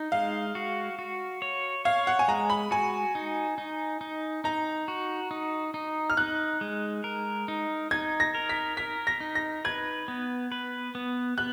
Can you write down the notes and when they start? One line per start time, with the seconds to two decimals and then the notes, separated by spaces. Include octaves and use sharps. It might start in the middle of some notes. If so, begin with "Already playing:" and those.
Already playing: D#4
0.12 G#3 F5
0.55 F#4
0.99 F#4
1.42 C#5
1.85 C#5 F5
2.07 F#5
2.19 G#5
2.28 G#3 A#5
2.50 B5
2.71 F#4 G#5
3.15 D#4
3.58 D#4
4.01 D#4
4.44 D#4 A#5
4.88 F#4
5.31 D#4
5.74 D#4
6.10 F6
6.17 D#4 F#6
6.61 G#3
7.04 A#4
7.48 D#4
7.91 D#4 G#6
8.20 A#6
8.35 A#4
8.49 B6
8.77 A#4 B6
9.07 A#6
9.20 D#4
9.35 A#6
9.65 B4 G#6
10.08 B3
10.52 B4
10.95 B3
11.38 B3 F#6